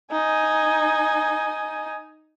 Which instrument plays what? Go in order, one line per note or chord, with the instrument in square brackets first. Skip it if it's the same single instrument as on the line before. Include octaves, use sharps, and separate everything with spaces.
[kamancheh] D#4 G#5